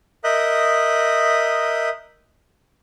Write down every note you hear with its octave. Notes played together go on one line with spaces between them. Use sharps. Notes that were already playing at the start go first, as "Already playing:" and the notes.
A#4 D#5 E5 D#6 F#6 G6